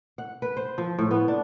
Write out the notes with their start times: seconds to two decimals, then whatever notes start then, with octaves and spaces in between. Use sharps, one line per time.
0.18 F#5
0.42 B4
0.57 C5
0.78 F3
0.99 A2
1.11 B3
1.28 D4